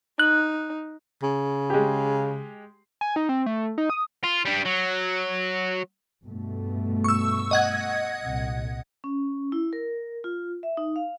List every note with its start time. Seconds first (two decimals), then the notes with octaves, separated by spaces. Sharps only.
0.19 D#4 F#6
1.23 C#3
1.70 G#3 G4
3.01 G#5
3.16 D#4
3.29 C4
3.46 A3
3.78 D#4
3.90 D#6
4.24 F4
4.45 G3 D4
4.66 F#3
6.25 G2 B2 A3
7.04 C#6 E6
7.51 D#5 F#5 G#6
8.23 C2 A#2
9.04 C#4
9.52 E4
9.73 A#4
10.24 F4
10.63 E5
10.77 D#4
10.96 F5